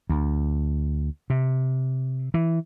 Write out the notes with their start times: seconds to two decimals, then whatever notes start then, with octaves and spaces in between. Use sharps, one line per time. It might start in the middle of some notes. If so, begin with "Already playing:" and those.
0.09 D2
1.30 C3
2.34 E3